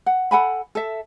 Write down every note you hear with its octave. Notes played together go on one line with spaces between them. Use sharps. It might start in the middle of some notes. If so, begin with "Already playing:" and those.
F#5
A4 F#5 G#5 B5
A4 E5